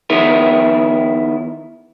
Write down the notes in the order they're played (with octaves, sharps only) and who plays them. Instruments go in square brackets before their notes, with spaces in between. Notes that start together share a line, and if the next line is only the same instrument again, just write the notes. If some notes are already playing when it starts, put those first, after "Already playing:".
[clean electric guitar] D#3 B3 E4 A#4